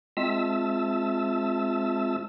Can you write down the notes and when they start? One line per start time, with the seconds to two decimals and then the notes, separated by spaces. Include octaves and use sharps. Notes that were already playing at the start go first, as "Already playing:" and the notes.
0.17 G#3 C4 F4 E5 A5 E6